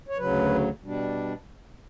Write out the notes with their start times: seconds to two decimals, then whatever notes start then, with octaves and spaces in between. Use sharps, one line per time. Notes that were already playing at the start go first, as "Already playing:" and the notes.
0.08 C#5
0.18 D2 C#3 F#3 B4
0.82 B2 G3 D4